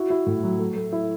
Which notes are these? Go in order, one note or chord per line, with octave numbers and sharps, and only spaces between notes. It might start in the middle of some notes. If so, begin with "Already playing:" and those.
Already playing: E4 F#4
E4
A2
F#3
A3
A3
E4